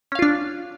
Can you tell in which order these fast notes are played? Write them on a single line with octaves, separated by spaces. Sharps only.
C#4 F5 F4 D4